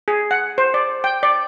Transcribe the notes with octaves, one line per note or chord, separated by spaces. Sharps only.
G#4
F#5
C5
D5
G5
D5